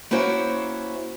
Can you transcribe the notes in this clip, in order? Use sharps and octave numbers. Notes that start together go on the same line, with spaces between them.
A#3 C#4 E4 F#4 C5